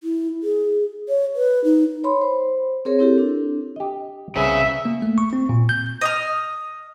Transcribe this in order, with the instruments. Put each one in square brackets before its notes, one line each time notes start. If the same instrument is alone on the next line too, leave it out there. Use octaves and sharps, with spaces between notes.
[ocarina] E4
G#4
C#5
B4
D#4
[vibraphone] C#5 B5 C6
C5
C4 G#4 A#4 C#5
C4 E4 G4 A4
D4
[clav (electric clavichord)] G4 D#5
[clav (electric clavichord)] C2 B3 G#4 [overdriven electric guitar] C#3 [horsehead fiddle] E5
[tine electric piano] A#3
A3
C#6
C4
A#2
G6
[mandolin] D#5 D#6 F6